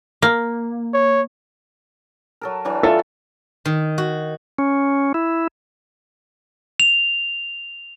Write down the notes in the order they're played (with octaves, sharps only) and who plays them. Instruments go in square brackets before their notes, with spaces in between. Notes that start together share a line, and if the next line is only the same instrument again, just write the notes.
[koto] A#3
[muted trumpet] C#5
[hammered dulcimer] F#3 A4 A#4
E3 F#3 D4
[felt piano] F4 A4 E5
[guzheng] D#3
F#4
[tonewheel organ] C#4
E4
[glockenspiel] F7